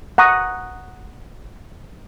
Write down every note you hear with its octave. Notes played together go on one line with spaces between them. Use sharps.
F#5 A#5 C#6 D#6